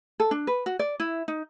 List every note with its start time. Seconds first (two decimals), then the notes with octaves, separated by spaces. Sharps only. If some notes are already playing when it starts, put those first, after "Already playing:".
0.20 A4
0.31 D4
0.47 B4
0.66 F#4
0.79 D5
1.00 E4
1.28 D#4